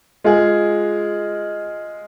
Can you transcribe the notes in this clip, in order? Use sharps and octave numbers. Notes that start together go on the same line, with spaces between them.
G#3 F4 G#4